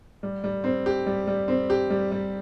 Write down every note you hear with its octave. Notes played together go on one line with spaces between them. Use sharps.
G3
G3
C4
G4
G3
G3
C4
G4
G3
G3